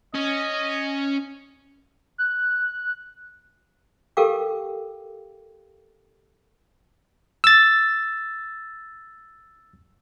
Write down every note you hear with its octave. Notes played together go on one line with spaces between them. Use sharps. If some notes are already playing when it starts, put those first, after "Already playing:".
C#4 D#5
F#6
G4 A4 A#4 F5 G5 D6
E6 A6